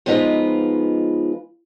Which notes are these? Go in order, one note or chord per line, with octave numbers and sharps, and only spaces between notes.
F3 G#3 B3 D#4 F4 B4